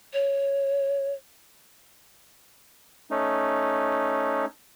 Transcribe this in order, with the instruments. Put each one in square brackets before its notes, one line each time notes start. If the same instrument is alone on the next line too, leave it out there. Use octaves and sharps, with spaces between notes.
[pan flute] C#5
[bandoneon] A3 C#4 D#4